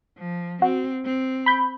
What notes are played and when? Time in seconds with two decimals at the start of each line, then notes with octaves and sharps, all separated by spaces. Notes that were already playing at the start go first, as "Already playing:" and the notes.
0.18 F3
0.62 C4 F#4
1.05 C4
1.46 B5 G6